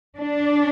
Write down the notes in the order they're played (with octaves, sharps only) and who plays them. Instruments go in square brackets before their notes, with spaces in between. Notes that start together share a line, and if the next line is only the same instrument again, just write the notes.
[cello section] D4